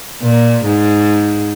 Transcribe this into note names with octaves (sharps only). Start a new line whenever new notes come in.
A#2
G#2